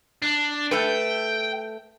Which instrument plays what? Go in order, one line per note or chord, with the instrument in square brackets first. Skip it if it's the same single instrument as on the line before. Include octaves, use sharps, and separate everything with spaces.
[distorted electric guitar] D4
[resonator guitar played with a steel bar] A3 A4 B4 [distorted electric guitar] G5